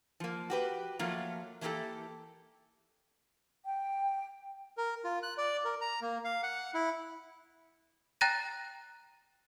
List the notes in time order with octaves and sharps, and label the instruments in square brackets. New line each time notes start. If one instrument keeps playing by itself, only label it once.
[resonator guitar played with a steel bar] F3 A#3
F#4 G4 B4
F3 F#3 A3 A#3 F4
E3 A3 A#3 E4 G4 A4
[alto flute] G5
[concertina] A#4
F4
F#6
D5
A#4
A#5
A#3
F5
F#5
E4
[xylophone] G5 A#5 F#6 A6 A#6 D#7